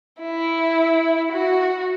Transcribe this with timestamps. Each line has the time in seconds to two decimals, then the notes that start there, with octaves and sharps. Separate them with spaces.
0.20 E4
1.32 F#4